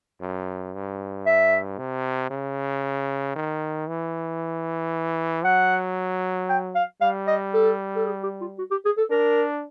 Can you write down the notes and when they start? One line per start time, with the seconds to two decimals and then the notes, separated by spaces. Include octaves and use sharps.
0.21 F#2
0.74 G2
1.26 E5
1.79 C3
2.31 C#3
3.36 D#3
3.88 E3
5.45 F#3 F#5
6.49 G5
6.75 F5
7.02 G3 F5
7.27 D#5
7.54 A4
7.96 A4
8.06 G#4
8.23 G4
8.41 F4
8.58 F#4
8.71 G4
8.85 G#4
8.98 A4
9.10 D4 A#4